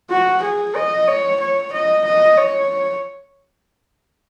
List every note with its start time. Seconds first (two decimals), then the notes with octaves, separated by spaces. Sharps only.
0.10 F#4
0.43 G#4
0.76 D#5
1.08 C#5
1.40 C#5
1.73 D#5
2.05 D#5
2.37 C#5